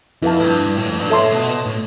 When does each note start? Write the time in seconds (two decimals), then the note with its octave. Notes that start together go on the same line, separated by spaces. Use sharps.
0.22 F2 E4 B4 F5 A5
0.40 A2
0.45 G2
0.66 G2
0.77 A2
0.88 F2
0.99 G2
1.10 A2 A4 E5 A5 C6
1.32 B2
1.66 A2